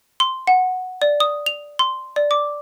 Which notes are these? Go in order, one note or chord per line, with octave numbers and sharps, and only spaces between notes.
C6
F#5
D5
D#6
F7
C6
D5
D6